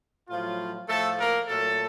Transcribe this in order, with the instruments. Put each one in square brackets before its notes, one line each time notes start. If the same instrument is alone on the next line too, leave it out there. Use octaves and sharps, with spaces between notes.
[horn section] A2 F3 F#3 F4
A2 F3 A3 A4
A#3 A#4
A#2 F#3 A3 A4